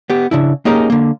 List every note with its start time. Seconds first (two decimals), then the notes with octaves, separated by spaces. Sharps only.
0.10 B3 G4
0.31 C#3 D4 E4
0.65 A#3 C#4 D#4 G4 G#4 A#4
0.90 D3 A#3